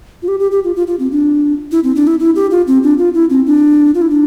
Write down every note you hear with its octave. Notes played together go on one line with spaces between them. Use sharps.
F4
G4
G4
G4
F4
F4
F4
C4
D4
E4
C4
D4
E4
E4
G4
F4
C4
D4
F4
E4
C4
D4
F4
E4
D4